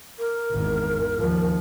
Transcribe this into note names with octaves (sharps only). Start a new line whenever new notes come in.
A#4
G#1 E2
D#2 F3